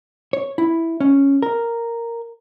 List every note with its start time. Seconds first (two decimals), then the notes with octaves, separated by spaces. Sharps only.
0.33 C#5
0.58 E4
1.00 C#4
1.42 A#4